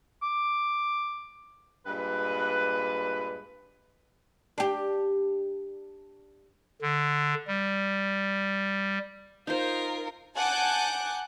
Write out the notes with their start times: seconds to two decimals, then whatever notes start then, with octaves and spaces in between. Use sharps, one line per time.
0.23 D6
1.86 G2 A#2 G#3 B4
4.58 D4 G4
6.82 D3
7.47 G3
9.47 D#4 F4 A#4 C5
10.35 F#5 G#5 A5 D6 F#6 G6